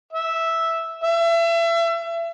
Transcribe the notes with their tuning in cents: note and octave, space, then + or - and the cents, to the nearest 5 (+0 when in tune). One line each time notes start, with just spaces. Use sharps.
E5 -5
E5 +30